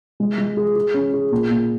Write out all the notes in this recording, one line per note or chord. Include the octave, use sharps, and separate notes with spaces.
G#3
G#3
G#4
G#4
C#4
G#4
A#2
A#2